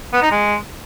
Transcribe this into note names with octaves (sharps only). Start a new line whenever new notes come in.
B3
D#4
G#3